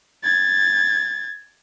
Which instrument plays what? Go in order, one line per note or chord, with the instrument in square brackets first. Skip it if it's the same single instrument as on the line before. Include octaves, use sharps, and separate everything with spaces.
[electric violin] G#6 A6